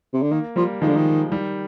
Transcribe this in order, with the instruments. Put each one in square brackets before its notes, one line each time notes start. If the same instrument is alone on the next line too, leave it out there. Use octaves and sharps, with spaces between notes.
[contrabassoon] C3
D3
[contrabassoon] D#3 [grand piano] A#3
[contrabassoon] F3 [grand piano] G3 A#3
[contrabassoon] D#3 [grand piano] F3 G#3
[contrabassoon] D3
D#3
[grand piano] D#3 G3